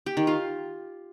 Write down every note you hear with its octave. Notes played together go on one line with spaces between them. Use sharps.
G4
D#3
F4